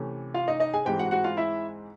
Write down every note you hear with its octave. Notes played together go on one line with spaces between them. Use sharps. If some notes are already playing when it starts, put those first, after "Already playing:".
Already playing: C3 E3 A3 C#4
F4 F5
D#4 D#5
D#4 D#5
G#4 G#5
G#2 E3 G#3 C4 G4 G5
F#4 F#5
F#4 F#5
F4 F5
E4 E5